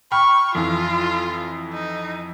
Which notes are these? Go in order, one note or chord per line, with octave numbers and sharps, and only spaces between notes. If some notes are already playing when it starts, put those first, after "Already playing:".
G5 B5 C#6 F6
F2 E3 F4
D#4